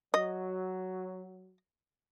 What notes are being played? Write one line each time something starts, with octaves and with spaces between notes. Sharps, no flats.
F#3 D#5